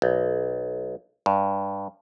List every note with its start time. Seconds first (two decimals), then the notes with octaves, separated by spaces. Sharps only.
0.02 B1
1.26 G2